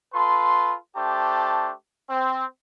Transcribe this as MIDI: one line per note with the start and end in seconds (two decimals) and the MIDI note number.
0.14 0.75 65
0.14 0.75 69
0.14 0.75 71
0.14 0.75 84
0.97 1.71 57
0.97 1.71 62
0.97 1.71 67
0.97 1.71 72
0.97 1.71 81
2.09 2.44 60